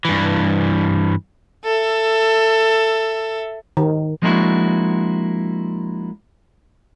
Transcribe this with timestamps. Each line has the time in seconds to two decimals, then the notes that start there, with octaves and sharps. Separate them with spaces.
0.05 G2 E3
1.64 A4 E5
3.77 D#3
4.22 F3 G#3 A#3 D4 E4 F#4